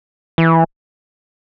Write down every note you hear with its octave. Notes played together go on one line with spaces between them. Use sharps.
E3